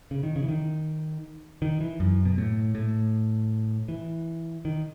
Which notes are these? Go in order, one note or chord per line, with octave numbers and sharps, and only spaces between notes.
C#3
D#3
C#3
E3
D#3
D#3
E3
F#2
B2
A2
A2
E3
D#3